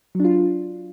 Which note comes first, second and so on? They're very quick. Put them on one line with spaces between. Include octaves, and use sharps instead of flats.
F#3 D4 F4